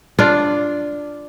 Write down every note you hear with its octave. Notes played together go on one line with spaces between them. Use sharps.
D4 F4